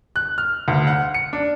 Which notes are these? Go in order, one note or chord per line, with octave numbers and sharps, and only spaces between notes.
F#6
F6
D2
F#5
C#7
D4